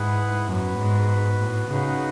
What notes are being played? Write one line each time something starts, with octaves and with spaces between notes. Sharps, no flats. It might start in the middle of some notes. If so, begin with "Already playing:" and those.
Already playing: G#2 E4 G#4 B4 F#5
F#2 B3 F#4 B4
G#2
A2
C#3 D#4 F#4 B4 F#5